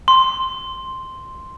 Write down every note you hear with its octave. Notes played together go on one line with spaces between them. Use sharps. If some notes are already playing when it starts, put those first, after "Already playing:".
C6